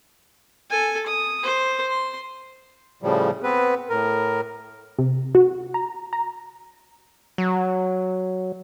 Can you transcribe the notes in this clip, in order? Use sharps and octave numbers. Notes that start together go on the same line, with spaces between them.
A4 G#5
D#6
C5
C6
A2 C#3 F3 G3
B3 C4 B4
A2 A#4
C3
F#4
A#5
A#5
F#3